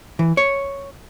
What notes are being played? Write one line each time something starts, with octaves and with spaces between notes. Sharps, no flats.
E3
C#5